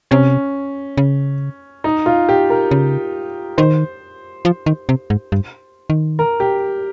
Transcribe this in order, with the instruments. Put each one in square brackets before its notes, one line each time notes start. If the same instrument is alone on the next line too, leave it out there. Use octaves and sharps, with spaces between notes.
[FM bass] C3 [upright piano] C#4
[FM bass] C#3
[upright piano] D#4
F4
G4
A#4
[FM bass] C#3
[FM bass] D#3 [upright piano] C5
[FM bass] F3
D#3
C3
G#2
G2
D#3
[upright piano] A#4
G4